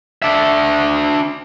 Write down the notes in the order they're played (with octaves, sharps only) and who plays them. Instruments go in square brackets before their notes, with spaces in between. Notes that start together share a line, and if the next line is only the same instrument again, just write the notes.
[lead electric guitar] D4 E5